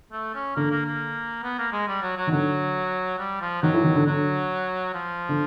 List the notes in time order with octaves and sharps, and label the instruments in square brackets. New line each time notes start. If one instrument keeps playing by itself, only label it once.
[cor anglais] A3
C#4
[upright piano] D3 [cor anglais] A#3
[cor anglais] A#3
A#3
B3
A#3
G#3
G3
F#3
F#3
[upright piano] D#3
[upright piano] D3 [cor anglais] F#3
[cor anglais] G3
F3
[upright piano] D#3 [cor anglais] F#3
[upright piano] E3
D#3
D3
[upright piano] D3 [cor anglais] F#3
[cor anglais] F3
[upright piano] D3